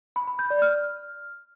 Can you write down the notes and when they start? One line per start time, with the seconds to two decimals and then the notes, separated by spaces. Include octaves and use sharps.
0.16 B5
0.27 B5
0.39 G6
0.50 D5
0.62 F6